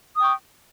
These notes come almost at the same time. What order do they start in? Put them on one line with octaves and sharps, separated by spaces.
D#6 G5 C#6